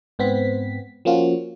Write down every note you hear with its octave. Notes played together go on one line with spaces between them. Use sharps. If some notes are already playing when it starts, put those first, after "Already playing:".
G#2 B3 C4 B6
F3 A#3 C#4 F4 F#4